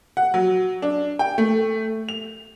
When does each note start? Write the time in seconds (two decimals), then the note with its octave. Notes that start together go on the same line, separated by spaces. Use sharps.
0.17 F#5
0.34 F#3
0.82 D4
1.19 G5
1.38 A3
2.09 F7